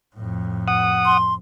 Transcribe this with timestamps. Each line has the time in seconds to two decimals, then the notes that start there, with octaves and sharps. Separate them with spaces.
0.16 F2 A2
0.68 F#5 D#6
1.05 C6